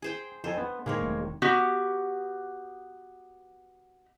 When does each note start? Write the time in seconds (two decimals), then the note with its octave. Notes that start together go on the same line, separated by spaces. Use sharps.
0.02 G#4 C5 G5 G#5
0.44 F2 A4 C5 G#5
0.58 B3 D4
0.86 A#2 D#3 G#3 A#3 C4 C#5
1.01 E1 A3
1.42 B3 F#4 G4